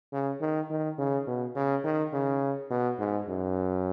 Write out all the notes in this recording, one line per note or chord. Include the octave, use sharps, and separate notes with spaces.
C#3
D#3
D#3
C#3
B2
C#3
D#3
C#3
B2
G#2
F#2